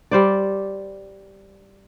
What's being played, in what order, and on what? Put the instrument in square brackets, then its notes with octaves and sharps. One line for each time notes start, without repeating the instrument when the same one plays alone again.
[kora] G3 C5 D5